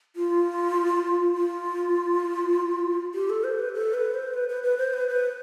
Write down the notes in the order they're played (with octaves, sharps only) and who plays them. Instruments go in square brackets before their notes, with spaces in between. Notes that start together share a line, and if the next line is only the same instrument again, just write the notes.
[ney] F4
F4
G4
A4
C5
B4
A4
B4
C5
B4
B4
B4
C5
B4
B4